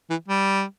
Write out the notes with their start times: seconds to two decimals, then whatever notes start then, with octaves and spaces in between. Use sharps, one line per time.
0.10 E3
0.28 G3